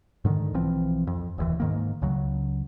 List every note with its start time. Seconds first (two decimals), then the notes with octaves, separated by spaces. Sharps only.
0.25 G#2 D3 D#3
0.54 B1 E3 F3 C4
1.07 F2
1.38 E1 D#2 E3
1.60 G#2 D#3 A#3
2.02 C#2 C#3 F#3